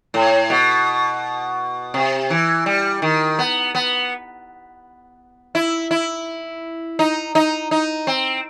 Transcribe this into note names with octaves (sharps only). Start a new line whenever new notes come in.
A2
B2
C3
E3
G3
D#3
B3
B3
E4
E4
D#4
D#4
D#4
C4